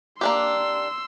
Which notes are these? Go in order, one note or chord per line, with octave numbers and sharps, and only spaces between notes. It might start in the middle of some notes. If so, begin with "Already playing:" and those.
A#3 D4 G4 C6 E6